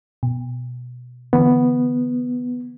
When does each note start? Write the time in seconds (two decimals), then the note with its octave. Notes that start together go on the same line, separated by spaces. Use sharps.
0.23 B2
1.33 D3 E3 B3